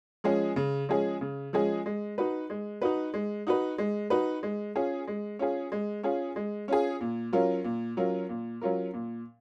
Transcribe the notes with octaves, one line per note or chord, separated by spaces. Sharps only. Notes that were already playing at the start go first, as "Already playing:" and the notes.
F3 G#3 C#4 G#4
C#3
F3 G#3 C#4 G#4
C#3
F3 G#3 C#4 G#4
G#3
D#4 F#4 B4
G#3
D#4 F#4 B4
G#3
D#4 F#4 B4
G#3
D#4 F#4 B4
G#3
C#4 F4 G#4
G#3
C#4 F4 G#4
G#3
C#4 F4 G#4
G#3
C#4 F4 G#4
A#2
F#3 C#4 F4 A#4
A#2
F#3 C#4 F4 A#4
A#2
F#3 C#4 F4 A#4
A#2